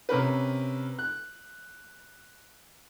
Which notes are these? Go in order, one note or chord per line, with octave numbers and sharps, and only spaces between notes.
C3 C#4 A#4 B4
F#6